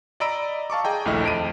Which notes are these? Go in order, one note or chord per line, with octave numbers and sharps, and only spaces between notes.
D5 D#5 A#5 B5 E6 D7
F5 A5 C#6 D6
G#4 D#5 G5 A#5
A#1 D#2 A3 E4 D#5 F6
F2 D7 D#7